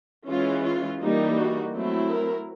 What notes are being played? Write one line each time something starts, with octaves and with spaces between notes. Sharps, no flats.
E3 G#3 C#4 F4
F4
E3 G3 A#3 D#4
F#4
F#3 A3 C4 E4
A#4